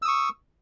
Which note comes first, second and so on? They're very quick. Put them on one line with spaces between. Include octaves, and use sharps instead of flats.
E6 D#6 C#6